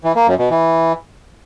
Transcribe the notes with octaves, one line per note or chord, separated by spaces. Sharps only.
E3
A#3
F#2
B2
E3